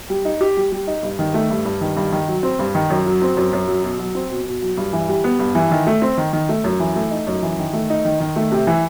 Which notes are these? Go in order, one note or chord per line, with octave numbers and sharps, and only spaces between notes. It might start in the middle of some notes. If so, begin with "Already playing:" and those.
G3
D#4
G4
G3
G3
D#4
G2
D#3
A3
G2
G2
D#3
G2
D#3
F#3
C4
G2
D#3
F#2
F#3
C4
F#2
F#2
F#3
B2
F#3
C4
B2
B2
F#3
G2
E3
G3
B3
G2
E3
D#3
A3
C4
D#3
D#3
A3
F#2
E3
A3
D#4
F#2
E3
D#3
A3
D#4
D#3
D#3
A3
C3
E3